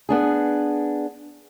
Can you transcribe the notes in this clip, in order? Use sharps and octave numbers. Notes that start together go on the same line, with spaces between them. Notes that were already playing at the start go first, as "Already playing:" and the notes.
B3 D4 G#4